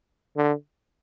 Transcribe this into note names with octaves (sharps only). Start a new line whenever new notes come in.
D3